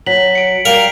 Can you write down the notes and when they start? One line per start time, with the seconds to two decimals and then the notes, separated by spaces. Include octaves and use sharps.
0.06 F#3 B6 F#7
0.35 C#7 D7
0.65 G3 A#4 F5